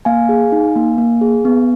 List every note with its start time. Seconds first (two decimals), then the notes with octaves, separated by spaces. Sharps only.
0.05 A#3 F5 G#5
0.29 G#4
0.52 D#4
0.76 A#3
0.98 A#3
1.21 G#4
1.45 B3